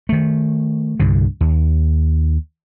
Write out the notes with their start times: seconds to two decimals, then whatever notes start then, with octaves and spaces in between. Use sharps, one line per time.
0.09 D#3 A3
1.00 C2 G2 D3
1.41 D#2